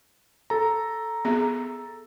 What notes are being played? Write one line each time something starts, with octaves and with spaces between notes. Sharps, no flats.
A4 A#5
B3 G#4 E5